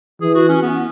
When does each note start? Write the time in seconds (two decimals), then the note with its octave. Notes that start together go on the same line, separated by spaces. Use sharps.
0.21 E3 G#4
0.35 F#4
0.49 C#4
0.63 B3